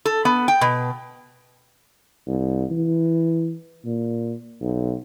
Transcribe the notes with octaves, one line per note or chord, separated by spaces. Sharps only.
A4
B3
G5
B2
C2
E3
A#2
B1